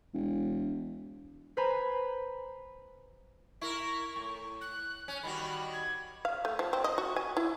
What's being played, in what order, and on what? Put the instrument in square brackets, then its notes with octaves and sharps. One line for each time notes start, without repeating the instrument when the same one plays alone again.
[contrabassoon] E1
[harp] B4 C5 G#5 A#5 B5
[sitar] E4 A#4 [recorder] C#6
[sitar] A2
[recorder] F#6
[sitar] C#4
[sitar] D#3 G3 F#4 [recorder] B5
[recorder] G#6
[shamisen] F5
A3
F3
C4
D#5
F#4
G#5
E4